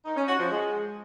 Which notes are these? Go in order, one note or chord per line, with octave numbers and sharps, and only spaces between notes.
D#4
C#4
F#4
F3
G#3